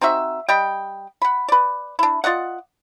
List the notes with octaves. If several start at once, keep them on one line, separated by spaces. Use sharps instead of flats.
C4 D#4 F#4 E5
G3 D#5 G5
F#5 B5
B4 D5
D4 E4
F4 D5 D#5 F#5